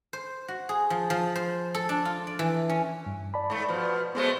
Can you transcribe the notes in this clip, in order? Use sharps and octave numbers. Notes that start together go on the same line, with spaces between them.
C5
F#4
G#4
F3
F3
C5
A4
D4
F4
D5
E3
C#4
G2
D5 A5 B5
G#2 A3
B2 F3
B2 G#3 A3 B3 G#4 C5